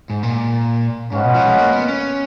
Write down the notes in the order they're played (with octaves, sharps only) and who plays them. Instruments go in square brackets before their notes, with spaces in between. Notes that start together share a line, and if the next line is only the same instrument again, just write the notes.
[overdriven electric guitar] G#2
A#2
[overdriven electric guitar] G#2 [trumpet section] C#4 F4 B4 D#5 F#5
[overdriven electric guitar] B2
F3
G#3
A#3
B3
C#4